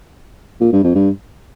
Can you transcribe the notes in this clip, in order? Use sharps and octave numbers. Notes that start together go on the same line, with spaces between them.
A#2
G2
F2
G2